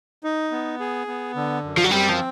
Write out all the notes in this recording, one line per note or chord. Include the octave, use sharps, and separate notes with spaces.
D#4
B3
G#4
B3
D3
F#2
F3
F#3
G3 C4
F3